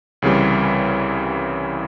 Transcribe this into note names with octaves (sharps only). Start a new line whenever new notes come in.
C2 C#3 E3 G3